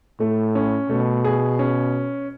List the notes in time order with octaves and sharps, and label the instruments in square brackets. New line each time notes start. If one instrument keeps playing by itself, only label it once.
[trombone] A2 [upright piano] A3
[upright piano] C#4
[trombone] B2 [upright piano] A3
[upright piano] G#4
C#4